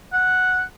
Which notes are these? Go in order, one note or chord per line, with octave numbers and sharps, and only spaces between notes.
F#5